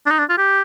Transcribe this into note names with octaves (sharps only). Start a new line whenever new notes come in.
D4
D#4
D4
F4
G4